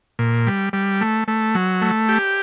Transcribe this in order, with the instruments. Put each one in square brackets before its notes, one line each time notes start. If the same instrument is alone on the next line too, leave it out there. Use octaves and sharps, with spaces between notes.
[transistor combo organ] A#2
G3
G3
A3
A3
F#3
A3
G4